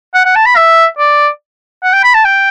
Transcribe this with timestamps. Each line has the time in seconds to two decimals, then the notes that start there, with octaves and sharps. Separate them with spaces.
0.14 F#5
0.25 F#5
0.36 A5
0.46 B5
0.56 E5
0.98 D5
1.83 F#5
1.93 G5
2.04 B5
2.14 A5
2.25 G5